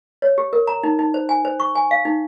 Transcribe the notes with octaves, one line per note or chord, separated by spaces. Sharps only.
C#5
G4
A#4
A#5
D#4
D#4
C5
G#5
C5
C#6
G#5
F5
D#4